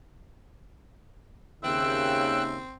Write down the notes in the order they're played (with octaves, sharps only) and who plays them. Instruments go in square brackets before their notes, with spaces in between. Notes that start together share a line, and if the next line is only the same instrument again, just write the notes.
[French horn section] D#2 C#3 [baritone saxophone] C4 [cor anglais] E5 [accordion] G5 E6 F#6